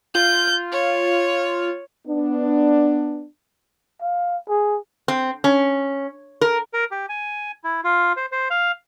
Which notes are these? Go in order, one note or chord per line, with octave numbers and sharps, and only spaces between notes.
F4 G6
C#5
B3 D4
F5
G#4
C4
C#4
A#4
A#4
G4
G#5
E4
F4
C5
C5
F5